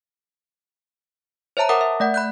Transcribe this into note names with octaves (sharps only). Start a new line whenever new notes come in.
C5 C#5 E5 A5 A#5
A#4 E5 F#5 D6 D#6
E5
A3 D5 F#5
B5 F#6 G6